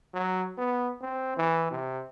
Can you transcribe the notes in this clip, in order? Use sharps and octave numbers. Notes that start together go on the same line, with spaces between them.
F#3
B3
C4
E3
C3